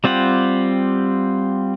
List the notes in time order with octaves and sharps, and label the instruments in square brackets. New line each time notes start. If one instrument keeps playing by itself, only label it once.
[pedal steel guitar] G3 C4 F4 G4 F#5